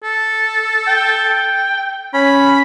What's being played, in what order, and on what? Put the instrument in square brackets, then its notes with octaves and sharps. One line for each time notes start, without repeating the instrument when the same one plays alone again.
[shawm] A4
[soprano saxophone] G5
[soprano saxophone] C#4 [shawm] B5